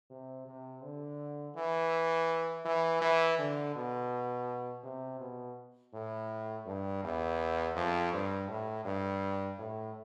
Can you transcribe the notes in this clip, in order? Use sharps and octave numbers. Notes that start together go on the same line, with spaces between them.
C3
C3
D3
E3
E3
E3
D3
B2
C3
B2
A2
G2
E2
F2
G2
A2
G2
A2